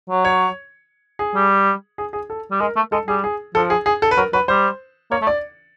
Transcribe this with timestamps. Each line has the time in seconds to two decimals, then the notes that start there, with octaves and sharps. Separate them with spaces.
0.10 F#3
0.25 C#5
1.19 G#4
1.35 G3
1.98 G#4
2.13 G#4
2.30 A4
2.51 G3
2.60 G#3 A#4
2.76 A3
2.92 G#3 A4
3.08 G3 G#4
3.24 G#4
3.55 F3 A4
3.70 G#4
3.86 G#4
4.02 A4
4.11 B4
4.17 F#3 A#4
4.33 F#3 B4
4.48 G3 C5
5.11 A#3 C#5
5.22 A3
5.27 D5